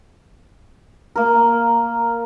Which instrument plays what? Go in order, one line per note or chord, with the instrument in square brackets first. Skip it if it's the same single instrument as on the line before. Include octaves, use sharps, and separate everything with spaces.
[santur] A#3 A#4